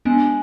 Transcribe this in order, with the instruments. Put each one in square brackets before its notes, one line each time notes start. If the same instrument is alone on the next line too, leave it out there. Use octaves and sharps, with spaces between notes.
[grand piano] G#3 [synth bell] B3 D4